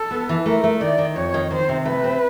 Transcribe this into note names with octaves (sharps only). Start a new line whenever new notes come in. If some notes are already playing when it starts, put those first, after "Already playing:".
Already playing: A4
B3
E3
A3 A#4
A3
D#3 D5
D#3
F2 C#5
D#3
D#3 C5
C3
A3 B4
C4